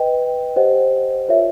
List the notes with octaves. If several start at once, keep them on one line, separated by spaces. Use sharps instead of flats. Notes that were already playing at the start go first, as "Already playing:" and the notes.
Already playing: B4 D#5 G5
G4 C5 D#5 F#5
F4 A#4 C#5 E5